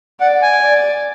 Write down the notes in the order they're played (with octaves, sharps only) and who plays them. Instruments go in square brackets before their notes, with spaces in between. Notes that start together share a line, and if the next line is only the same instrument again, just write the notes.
[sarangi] D5 [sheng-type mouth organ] F#5
[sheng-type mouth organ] G#5
[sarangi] D5